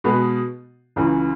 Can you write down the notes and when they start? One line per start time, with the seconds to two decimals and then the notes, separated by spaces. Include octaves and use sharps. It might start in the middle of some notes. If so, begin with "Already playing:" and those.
0.04 B2 G#3 B3 F#4 B4
0.96 C#2 C#3 E3